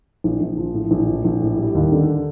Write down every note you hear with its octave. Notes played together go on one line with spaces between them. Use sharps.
A#1
A#1
F3
A2
A#1
F3
A#1
A2
G3
D#2
D3